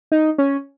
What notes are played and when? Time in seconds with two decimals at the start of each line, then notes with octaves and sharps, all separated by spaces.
0.12 D#4
0.38 C#4